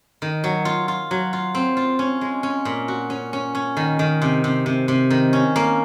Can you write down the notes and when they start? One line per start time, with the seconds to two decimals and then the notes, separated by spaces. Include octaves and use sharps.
0.22 D#3
0.44 F#3
0.65 F4
0.88 F4
1.11 F#3
1.33 F4
1.55 C4
1.77 F4
1.99 C#4
2.21 G#3
2.43 C#4
2.65 A#2
2.88 F#4
3.10 C#4
3.33 C#4
3.55 C#4
3.77 D#3
3.99 D#3
4.22 C3
4.44 C3
4.66 C3
4.88 C3
5.10 D#3
5.33 C#4
5.56 A#3